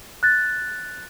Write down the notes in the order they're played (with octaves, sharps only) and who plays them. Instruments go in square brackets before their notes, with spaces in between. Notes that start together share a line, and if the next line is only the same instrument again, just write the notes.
[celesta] F#6 A6